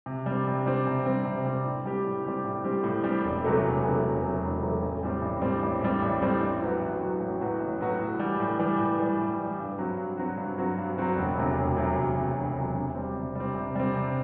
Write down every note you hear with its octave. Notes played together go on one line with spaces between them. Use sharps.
C3
G3 C4
C3
G3 C4
C3
G3 C4
C3
G3 C4
A2
G3 C4 G4
A2
G3 C4 G4
A2
G3 C4 G4
A2
G3 C4 G4
E1
E2 C3 F#3 A3
E1
E2 C3 F#3 A3
E1
E2 C3 F#3 A3
E1
E2 C3 F#3 A3
A1
A2 G3 C4
A1
A2 G3 C4
A1
A2 G3 C4
A1
A2 G3 C4
A1
A2 F#3 B3 F#4
A1
A2 F#3 B3 F#4
A1
A2 F#3 B3 F#4
A1
A2 F#3 B3 F#4
A2
E3 G3
A2
E3 G3
A2
E3 G3
A2
E3 G3
G2
F#3 C4 F#4
G2
F#3 C4 F#4
G2
F#3 C4 F#4
G2
F#3 C4 F#4
E1
D2 C3 F#3
E1
D2 C3 F#3
E1
D2 C3 F#3
E1
D2 C3 F#3
C3
G3 C4
C3
G3
C4
C3
G3 C4
C3